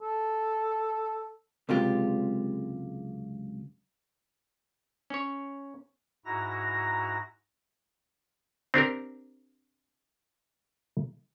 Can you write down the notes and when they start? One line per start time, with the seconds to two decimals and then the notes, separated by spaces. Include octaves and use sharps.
0.02 A4
1.69 C#2 F#2 C3 G#3 F4 G4
5.10 C#4 C#5
6.25 G#2 E4 F#4 A#5 A#6
8.74 C4 D4 G4 A#4